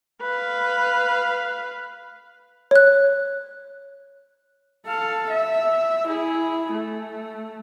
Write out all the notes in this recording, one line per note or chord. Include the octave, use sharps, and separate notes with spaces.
B4 F5
C#5 F#6
A4 F5
E5
E4 G#4
A3